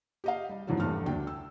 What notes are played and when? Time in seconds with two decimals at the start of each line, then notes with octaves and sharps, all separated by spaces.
0.24 G4 D#5 F5
0.49 G3
0.67 F2 G#2 D3 E3 F#3 G3
0.80 F1 E2 G2 A3 F6
1.06 D2 D4 G5
1.27 E6